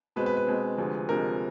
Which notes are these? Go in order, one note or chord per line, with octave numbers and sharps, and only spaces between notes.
B2 G#3 C4 B4
B4
B4
B2 G#3 C4
D2 C3 F3 G#3
D2 C3 F3 G#3 A#4